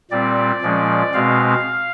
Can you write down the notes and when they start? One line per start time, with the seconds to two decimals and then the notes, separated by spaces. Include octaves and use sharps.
0.11 A#2 G3 C4 D5
0.62 A#2 F3 G#3 C#4
1.13 B2 G#3 C4 F5